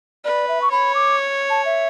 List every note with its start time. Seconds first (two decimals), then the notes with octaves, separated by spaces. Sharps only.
0.25 B4 D5
0.48 E5
0.62 C#6
0.71 C#5 B5
0.95 D6
1.50 A5
1.65 E5